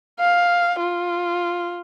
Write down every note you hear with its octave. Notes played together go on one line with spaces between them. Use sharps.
F5
F4